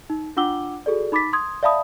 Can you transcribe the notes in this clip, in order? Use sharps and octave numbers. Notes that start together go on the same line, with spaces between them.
D#4
D4 F4 F#5 D6 E6 G7
F#4 G#4 A4 D5
D#4 B5 D6 A6 B6
C6 D#6 G#6
D5 E5 F5 A5 B5 D#6